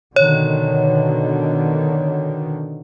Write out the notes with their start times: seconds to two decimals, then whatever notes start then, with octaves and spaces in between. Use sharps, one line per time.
0.16 B2 D3 D#3 C#5